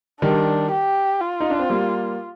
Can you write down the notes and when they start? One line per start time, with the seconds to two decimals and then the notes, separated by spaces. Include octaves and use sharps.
0.22 D#3 G3 D4
0.71 G4
1.21 F4
1.40 D#4
1.50 D4
1.59 C4
1.70 G3 A#3